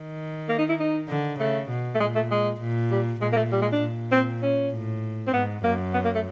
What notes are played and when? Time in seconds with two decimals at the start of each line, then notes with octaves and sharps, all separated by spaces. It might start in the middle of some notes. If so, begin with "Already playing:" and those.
Already playing: D#3
0.49 A#3
0.58 D#4
0.69 E4
0.79 D#4
1.09 D3
1.40 C#3 A3
1.69 B2
1.95 A3
2.00 A#2 G#3
2.15 A3
2.31 G#3
2.61 A#2
2.91 G3
3.21 A#2 G#3
3.32 A#3
3.36 A3
3.52 G3
3.62 G#3
3.72 D4
3.82 A#2
4.12 C4
4.42 C#4
4.72 A2
5.27 C4
5.33 G#2 B3
5.64 F#2 A#3
5.94 B3
6.04 A#3
6.14 A3